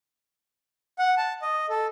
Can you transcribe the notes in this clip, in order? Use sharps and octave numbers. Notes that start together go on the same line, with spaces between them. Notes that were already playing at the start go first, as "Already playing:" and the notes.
F#5
A5
D#5
A4